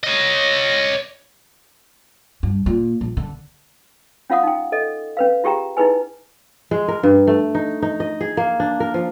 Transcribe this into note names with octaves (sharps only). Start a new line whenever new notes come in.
C#5 D#5
G2
A#2
A#1
D3
C#4 F4 F5 F#5 D#6
D#4 G5
A4 D#5
C#4 B4 F5
F4 G4 G#4 G5 A#5
D#4 E4 G#4 B4 G#5
G#3
A#4
G2
A3
D#4
D#4
D#5
G#4
A#3
D4
A#4
F3